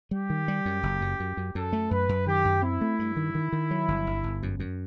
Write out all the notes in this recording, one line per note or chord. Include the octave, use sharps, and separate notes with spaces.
G3 G4
D#3
G3
F#2
F#1
F#2
F#2
F#2
F#2 A4
A3
F#2 B4
F#2
D#3 G4
F#2
C4 E4
A3
G2
D#3
D#3
D#3
F#3
G1
G1
G1
F#2
F#2